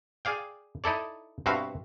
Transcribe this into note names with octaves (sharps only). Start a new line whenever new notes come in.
G#4 D5 F5 G5
D#4 E4 A4 D5
G2 B2 C4 F#4 E5 F5